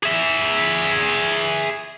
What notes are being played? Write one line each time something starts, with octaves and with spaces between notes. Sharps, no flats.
G#4 E5